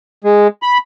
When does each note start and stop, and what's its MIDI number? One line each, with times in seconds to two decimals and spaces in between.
0.24 0.48 56
0.62 0.78 83